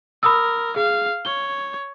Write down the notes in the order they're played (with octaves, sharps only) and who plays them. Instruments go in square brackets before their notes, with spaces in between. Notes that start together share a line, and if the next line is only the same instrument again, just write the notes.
[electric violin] A#4 [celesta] B5 D#6 E6
[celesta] G#4 [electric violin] F5
[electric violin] C#5 [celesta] G7